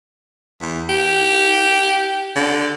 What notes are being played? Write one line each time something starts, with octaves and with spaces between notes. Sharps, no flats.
E2
G4
D3